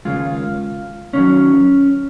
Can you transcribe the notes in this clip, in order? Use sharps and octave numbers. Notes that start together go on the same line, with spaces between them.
D#2 C#3 G#3 F4
D#2 D#3 F#3 C#4